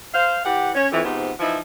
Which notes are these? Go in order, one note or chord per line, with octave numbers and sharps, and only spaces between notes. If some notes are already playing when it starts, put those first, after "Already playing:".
C5 F5
E3 G4 F#5
C#4 C#5
F2 E3
G#2 C3 F3 B3
E3 F3 D#4 E4